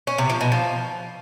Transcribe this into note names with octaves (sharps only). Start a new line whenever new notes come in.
C#4
C3
F3
B2
F3